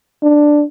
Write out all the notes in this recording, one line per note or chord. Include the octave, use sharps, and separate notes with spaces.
D4